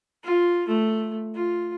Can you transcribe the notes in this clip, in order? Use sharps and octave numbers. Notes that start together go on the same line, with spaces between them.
F4
A3
F4